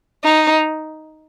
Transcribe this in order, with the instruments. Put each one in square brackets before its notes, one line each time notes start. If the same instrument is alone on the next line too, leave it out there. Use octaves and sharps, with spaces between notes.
[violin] D#4